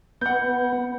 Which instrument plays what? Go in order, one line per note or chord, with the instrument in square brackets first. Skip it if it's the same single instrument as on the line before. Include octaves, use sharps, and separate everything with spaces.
[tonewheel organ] B3 [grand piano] F#5 G6